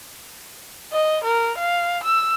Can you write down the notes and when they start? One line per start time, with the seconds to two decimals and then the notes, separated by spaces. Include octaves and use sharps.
0.92 D#5
1.24 A#4
1.57 F5
2.03 E6